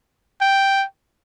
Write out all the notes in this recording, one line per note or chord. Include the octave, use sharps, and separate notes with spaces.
G5